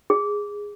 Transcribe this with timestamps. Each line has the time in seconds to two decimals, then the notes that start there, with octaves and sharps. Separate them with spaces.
0.10 G#4